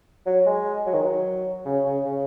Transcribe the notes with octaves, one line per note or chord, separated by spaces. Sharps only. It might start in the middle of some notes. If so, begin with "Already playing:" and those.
F#3
G#3
F#3
D#3
F#3
C#3
C#3
C#3